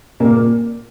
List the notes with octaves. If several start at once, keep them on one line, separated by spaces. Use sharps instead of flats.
A#2 A#3